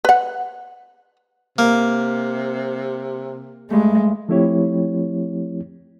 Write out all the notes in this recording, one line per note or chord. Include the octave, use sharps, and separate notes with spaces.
B4 F#5
C3 A#3
G2 G#3 A3
F3 A3 C4 E4 G4 C#5